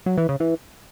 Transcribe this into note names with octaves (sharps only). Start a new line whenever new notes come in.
F#3
E3
C#3
E3